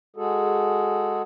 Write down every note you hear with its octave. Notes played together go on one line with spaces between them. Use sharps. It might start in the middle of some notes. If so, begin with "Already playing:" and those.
G#3 F#4 G#4 A4